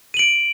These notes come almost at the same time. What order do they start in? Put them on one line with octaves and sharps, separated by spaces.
D#7 F#7 D7